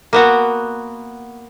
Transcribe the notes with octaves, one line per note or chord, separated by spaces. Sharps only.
A#3 B3 F#4